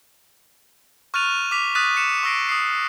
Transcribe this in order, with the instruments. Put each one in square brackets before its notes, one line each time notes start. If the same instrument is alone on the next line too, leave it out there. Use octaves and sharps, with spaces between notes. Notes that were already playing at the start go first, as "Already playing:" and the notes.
[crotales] C#6 F6 F#6 A6 D#7 F7
D6 B6 F7
D#6 F6 F#6 A6 B6 D#7
D#6 C#7 E7 F7
C#6 D6 E6 A#6 C7 D7
D#6 C7